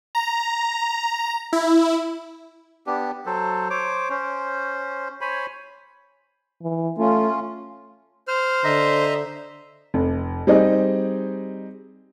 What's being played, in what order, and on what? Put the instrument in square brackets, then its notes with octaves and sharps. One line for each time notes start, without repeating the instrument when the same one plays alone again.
[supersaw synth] A#5
E4
[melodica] B3 D4 G4
F#3 A4 C5
C5 C#5 D6
C#4 C5
C5 C#5 G#5 B5
[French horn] E3
[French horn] A3 [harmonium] C#4 F4
[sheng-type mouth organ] C5 [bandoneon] F6
[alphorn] D3 [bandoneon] D#5 E5 A#5
[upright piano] F1
G3 C4 D#4 G#4 D#5